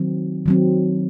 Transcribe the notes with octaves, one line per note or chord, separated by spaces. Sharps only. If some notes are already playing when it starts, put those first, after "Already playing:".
Already playing: D#3 F#3 C4
D#3 F#3 C4